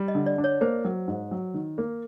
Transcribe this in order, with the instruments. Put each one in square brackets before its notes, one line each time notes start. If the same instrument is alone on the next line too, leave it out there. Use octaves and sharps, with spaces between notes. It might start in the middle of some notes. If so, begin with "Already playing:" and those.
Already playing: [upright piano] G3
[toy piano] D#5
[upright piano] D3
[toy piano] D5
[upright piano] D4
[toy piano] C#5
[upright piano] A#3 [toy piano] C5
[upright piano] F#3
G#2
F#3
D#3
A#3